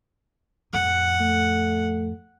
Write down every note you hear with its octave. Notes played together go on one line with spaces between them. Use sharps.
F2 A2 F#5
A3